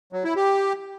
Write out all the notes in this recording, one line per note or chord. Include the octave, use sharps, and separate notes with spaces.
F#3
E4
G4